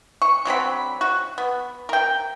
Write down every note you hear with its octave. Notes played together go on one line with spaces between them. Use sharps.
C#6
D3 F#3 C4 B5
F#4
B3
A#4 G5